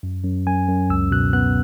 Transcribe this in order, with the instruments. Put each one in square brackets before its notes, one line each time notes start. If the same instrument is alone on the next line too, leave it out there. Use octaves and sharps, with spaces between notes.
[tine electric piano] F#2
F#2
F#2 G#5
F#2
C#2 E6
B2 F#6
B3 F#6